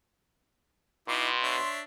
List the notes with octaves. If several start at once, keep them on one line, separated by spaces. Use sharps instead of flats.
B2 D#4 E4 C6 D6
D4 C#5 E5